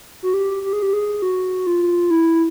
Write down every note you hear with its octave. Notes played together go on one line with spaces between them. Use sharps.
F#4
G4
G4
G#4
G4
G#4
F#4
F4
E4